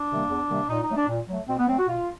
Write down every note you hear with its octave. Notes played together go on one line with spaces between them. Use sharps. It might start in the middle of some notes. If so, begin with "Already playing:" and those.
Already playing: D4
C3 D#3 G3 A#3
E2
C3 D#3 G3 A#3
A#2 D#4
D#4
F#3 A3
D4
A#2
F#3 A3
B2 C4
B3
F#3 A3 C4
F#4
B2 F4